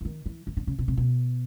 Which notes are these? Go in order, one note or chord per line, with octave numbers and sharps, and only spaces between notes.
E3
D#3
E3
D#3
D3
C#3
B2
C3
B2